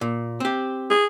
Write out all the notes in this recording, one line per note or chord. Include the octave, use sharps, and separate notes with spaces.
A#2
C4 G4
G#4